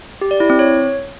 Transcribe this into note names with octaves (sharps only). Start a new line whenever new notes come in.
G4
D5
E4
C4
C#5